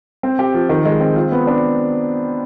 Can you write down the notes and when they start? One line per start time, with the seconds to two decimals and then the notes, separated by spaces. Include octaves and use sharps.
0.23 C4
0.39 G4
0.54 F3
0.69 D#3
0.85 G#3
1.01 C4
1.16 F4
1.32 B3
1.47 D4